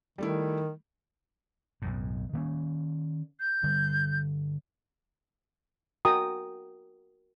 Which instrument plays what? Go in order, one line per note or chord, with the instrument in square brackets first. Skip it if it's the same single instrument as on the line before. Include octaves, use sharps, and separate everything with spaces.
[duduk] D#3 [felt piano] G3 A3 E4
[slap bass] B1 F#2 A2
D#3 A#3 C#4
[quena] G6
[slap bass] G2 D3 G3
[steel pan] F#4 A#4 G5 A#5 D#6